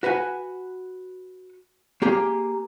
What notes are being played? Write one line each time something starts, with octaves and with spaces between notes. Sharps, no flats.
F#4 B4 F#5 G#5
A#3 G4 G#4